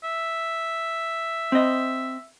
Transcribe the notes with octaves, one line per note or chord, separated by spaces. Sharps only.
E5
C4 D#5